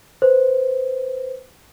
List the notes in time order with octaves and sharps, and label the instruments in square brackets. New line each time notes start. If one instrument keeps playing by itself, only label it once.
[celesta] B4 C5